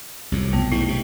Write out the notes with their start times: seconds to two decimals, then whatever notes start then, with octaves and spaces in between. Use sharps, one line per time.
0.32 C2 F2 A2
0.53 B1 A3 B3
0.72 G#2 E4
0.88 C3